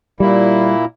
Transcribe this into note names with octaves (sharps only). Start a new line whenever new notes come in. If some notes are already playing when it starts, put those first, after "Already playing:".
A#2 G3 A#3 E4